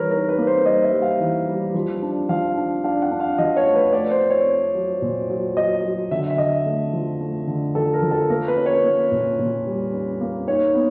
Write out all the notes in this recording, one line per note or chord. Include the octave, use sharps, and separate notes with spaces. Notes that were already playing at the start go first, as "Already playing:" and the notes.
Already playing: E3 G3 A#4 B4 C#5
D#4 A#4
B4
A#3
C5
G3 D#5
E5
G3
F5
E3
G3
F3
D4
F3 F5
D4
D4 F5
F#5
D4
F5
F3 D#5
C#5
A3
B4
A3 D5
C5
C4
C#5
C4
F#3
A#2
F#3
F#3 D#5
F#3
D3 E5
E5
D3 D#5
A3
F3
A3
D3
F3 A4
A#4
F3
A4
A#3 A#4
B4
C#4
C#5
A#3
A#2
A#2
G3
C#4
A#3
D#4 C#5
B3